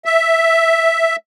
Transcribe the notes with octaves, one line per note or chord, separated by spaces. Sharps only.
E5